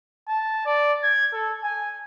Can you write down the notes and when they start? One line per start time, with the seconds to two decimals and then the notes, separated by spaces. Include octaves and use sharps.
0.28 A5
0.66 D5
1.03 G#6
1.33 A4
1.63 G#5